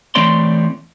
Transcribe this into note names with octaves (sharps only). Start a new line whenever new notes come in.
E3 A3 C4 C#5 D5 C6